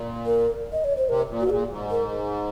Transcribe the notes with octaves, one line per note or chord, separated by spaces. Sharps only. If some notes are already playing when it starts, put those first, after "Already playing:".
Already playing: A#2
A#4
D#5
C#5
C5
C3 A#4
A#2
G#2 F#4
A#2 G#4
G#2
A#4